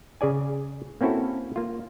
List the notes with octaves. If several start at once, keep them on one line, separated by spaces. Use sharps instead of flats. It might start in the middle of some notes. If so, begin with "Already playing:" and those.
C#3 G#4 D5 G#5
A#3 C4 C#4 E4 F#4 A4
A#3 F4